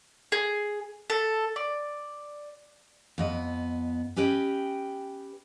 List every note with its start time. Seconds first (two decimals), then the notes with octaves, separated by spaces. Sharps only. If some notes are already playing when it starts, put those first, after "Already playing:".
0.32 G#4
1.10 A4
1.56 D5
3.18 F2 B3 D#5
4.16 C#4 G4 B4 D#5 G5